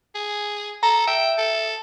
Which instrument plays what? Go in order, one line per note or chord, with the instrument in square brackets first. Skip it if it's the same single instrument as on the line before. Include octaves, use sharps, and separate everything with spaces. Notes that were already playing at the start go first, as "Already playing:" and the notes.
[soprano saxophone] G#4
[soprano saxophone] A4 [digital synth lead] A#5
[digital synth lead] E5 [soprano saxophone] G5
[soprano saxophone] A4